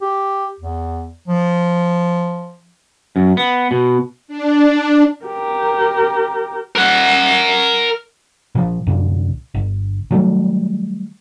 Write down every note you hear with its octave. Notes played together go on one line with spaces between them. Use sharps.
G4
E2
F3
F#2
B3
B2
D4
G4 A#4
A#4 F#5
A#2 E3 F3
C2 F#2 A#2 D3
G1
D#3 F#3 G3 A3